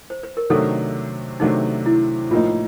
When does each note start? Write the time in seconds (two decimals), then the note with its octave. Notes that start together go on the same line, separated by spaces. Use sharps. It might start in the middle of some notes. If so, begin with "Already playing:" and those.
0.10 C5
0.23 B4
0.37 A#4
0.50 C3 D#3 F#3 A3 D4 A4
1.40 C3 D#3 F#3 A3 D4 D#4
1.86 E4
2.31 A2 F3 A#3 D#4 F4